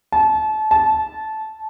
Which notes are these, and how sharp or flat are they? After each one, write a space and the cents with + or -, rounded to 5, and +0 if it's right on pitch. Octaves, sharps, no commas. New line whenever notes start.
A5 -30
A5 -15